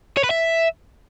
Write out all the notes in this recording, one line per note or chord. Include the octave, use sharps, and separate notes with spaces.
C#5
B4
E5